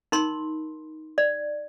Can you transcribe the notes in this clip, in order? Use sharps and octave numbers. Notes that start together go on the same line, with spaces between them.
D#4 A#4 B5 C6
D5